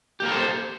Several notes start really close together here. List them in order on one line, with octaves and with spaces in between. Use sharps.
G4 A#3 A#4 A4 C5